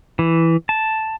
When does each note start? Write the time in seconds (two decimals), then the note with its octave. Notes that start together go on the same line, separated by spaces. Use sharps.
0.19 E3
0.69 A5